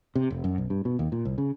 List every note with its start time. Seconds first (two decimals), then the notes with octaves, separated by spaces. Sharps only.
0.15 C3
0.30 F1
0.44 F#2
0.58 B1
0.70 G2
0.85 B2
0.99 D#2
1.12 A#2
1.25 C2
1.38 C#3